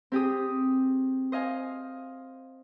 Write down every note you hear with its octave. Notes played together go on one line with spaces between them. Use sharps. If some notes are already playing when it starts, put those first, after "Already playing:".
C4 G4 G#4 D#6
C5 D#5 F5 G#5